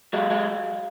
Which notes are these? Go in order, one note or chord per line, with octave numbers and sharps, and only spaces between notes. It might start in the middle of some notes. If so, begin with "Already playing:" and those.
F#3 G#3 F5
F#3 G#3